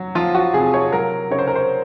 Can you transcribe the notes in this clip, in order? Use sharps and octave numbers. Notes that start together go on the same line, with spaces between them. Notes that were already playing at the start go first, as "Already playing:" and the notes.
Already playing: F#3
F3 F4
F#4
C3 G#4
C#5
F#3 A#4
C#3 C#5
C5
A#4
C5